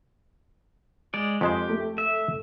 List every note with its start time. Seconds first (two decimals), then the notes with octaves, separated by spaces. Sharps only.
1.14 G#3 D5
1.41 F2 G#3 G4 C5
1.69 A3
1.98 E5